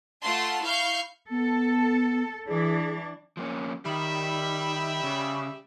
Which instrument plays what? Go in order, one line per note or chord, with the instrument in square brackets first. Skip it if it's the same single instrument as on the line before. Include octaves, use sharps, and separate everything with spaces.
[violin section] A3 F4 F#5 A5 C6
E4 F5 C#6 F6 G6 C7
[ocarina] B3 [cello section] A4
[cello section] E3 D4 [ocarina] G#4
[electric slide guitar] F3 A#3 C#4
[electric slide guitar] D#3 [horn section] G3 E5 [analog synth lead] B5
[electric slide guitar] C#3